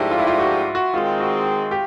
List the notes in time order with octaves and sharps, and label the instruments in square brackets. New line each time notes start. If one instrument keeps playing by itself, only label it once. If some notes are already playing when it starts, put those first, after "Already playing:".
Already playing: [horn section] G#2 F3 A3 D4 G4 [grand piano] E4
[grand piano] F4
E4
F4
F#4
F#4
[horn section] D#3 G#3 C4 [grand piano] F4
[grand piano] F#4
G4